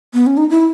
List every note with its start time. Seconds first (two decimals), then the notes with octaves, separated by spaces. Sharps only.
0.14 B3
0.27 C#4
0.37 D#4
0.50 E4